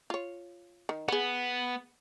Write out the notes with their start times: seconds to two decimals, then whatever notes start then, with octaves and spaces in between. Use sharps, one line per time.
0.10 F4 C#5
0.89 D#3
1.08 B3 G#4 F#5